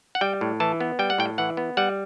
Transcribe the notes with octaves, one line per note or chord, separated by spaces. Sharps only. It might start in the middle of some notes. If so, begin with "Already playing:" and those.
F#5
G3 G5
A2
E3 A5
B3
G3 G5
F#5
A2 G5
E3 F#5
B3
G3 F#5